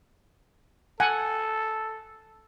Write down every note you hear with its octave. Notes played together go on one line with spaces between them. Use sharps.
A4 F#5 G#5